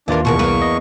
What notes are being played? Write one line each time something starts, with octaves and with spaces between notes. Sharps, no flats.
D#2 E3 D4 F4 A#4
E2 B2 G#4 A#4 C#6
C2 A#3 B4
D#5